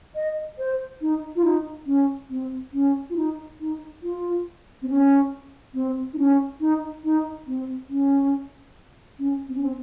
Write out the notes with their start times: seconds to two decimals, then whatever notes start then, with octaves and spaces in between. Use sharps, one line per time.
0.15 D#5
0.58 C5
1.01 D#4
1.36 F4
1.45 D#4
1.86 C#4
2.30 C4
2.73 C#4
3.10 F4
3.16 D#4
3.60 D#4
4.02 F4
4.82 C4
4.89 C#4
5.74 C4
6.13 D#4
6.18 C#4
6.60 D#4
7.04 D#4
7.47 C4
7.89 C#4
9.19 C#4
9.48 C4
9.55 C#4
9.63 C4